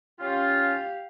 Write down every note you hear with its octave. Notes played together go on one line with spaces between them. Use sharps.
C#4 F4 G4 F5